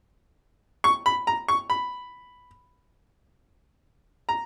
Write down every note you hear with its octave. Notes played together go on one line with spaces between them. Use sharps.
C#6
B5
A#5
C#6
B5
A#5